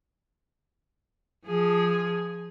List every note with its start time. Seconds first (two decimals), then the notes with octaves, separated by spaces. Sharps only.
1.46 F3 G#4